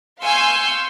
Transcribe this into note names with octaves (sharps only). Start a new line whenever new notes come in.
F5 G#5 C6 C#6 E6 G6